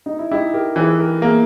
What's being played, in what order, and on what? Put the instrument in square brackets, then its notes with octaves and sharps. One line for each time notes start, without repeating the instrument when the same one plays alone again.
[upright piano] D#4
E4
[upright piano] D#4 G4 [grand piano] E4
[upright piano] G4 A#4
[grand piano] E3 [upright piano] G#4 B4
[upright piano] G4 A#4
[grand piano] A#3 [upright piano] E4 G#4